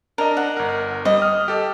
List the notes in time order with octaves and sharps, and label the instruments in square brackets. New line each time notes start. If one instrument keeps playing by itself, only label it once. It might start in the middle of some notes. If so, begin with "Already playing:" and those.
[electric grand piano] D4 D#5 [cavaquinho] A#4
[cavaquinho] F#5
[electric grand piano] G1 A#4
[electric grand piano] G3 [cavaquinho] D#5
[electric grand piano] D#6 F6
G4 A4